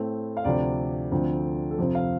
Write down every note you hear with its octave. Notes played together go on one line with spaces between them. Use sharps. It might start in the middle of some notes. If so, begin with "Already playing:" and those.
Already playing: A2 A3 C4
F5
D2 C3 F3 C4 D5
D2 D3 F3 C4
A4
F2 C3 F3 C4 C5
F5